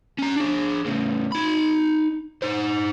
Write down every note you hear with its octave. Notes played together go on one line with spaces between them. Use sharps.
C#4 A#5
D4 G#4
A2 C#3
D#4 B5
D#4 C5